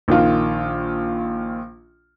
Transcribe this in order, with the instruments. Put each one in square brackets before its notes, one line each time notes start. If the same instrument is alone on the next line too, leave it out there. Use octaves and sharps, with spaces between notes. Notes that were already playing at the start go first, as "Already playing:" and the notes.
[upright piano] A#1 D#3 F4